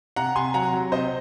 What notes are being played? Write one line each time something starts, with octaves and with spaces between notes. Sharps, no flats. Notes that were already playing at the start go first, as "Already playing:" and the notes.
C3 F#5 A#5
C3 G#5 C6
F#3 F#5 A#5
F#3
C3 C5 D#5